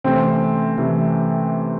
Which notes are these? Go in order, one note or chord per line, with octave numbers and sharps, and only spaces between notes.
C3 E3 A3 C4 C#4
C3 E3 A3 C#4